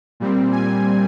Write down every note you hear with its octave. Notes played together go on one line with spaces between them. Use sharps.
A#2 G3 C4
G#5